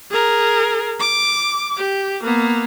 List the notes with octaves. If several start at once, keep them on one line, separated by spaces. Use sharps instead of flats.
G#4 A#4
D6
G4
A#3 B3